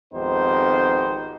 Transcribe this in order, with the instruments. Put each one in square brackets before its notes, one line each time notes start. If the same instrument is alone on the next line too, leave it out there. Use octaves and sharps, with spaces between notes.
[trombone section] G#1 F2 B3 D#4 G4 C5